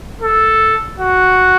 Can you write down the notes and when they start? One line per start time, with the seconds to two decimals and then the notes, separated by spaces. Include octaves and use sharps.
0.22 A4
0.99 F#4